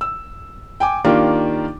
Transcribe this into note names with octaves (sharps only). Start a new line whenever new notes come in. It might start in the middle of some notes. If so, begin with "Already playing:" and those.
E6
G5 G#5 D6
D#3 A#3 D4 F4 G4